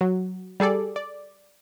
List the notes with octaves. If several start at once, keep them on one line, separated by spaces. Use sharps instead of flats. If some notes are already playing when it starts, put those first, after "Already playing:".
F#3
G3 G#4 A4 D5
D5